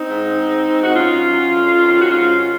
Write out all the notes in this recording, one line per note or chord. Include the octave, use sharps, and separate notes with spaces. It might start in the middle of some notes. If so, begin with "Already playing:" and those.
Already playing: C4 D#4
G#2
G#2
G#2
F#4
F#2 C#4 F4
F#2
F2
D#3
F#4
G#2 C#4 F4